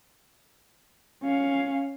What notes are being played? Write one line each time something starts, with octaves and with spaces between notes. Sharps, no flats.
C#4 F5